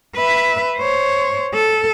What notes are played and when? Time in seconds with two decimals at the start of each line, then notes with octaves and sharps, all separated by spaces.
0.16 B4 E5
0.77 C5 C#5
1.55 A4